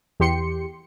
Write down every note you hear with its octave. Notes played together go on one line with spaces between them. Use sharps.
E2 G4 C6 C#7